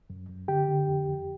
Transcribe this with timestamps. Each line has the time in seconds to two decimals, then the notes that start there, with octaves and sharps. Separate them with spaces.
0.10 F#2
0.29 F#2
0.48 D3 G4 G5
0.68 D3
0.88 F2
1.08 F2